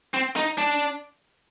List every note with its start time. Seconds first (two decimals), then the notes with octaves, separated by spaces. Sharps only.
0.14 C4
0.36 D#4
0.58 D4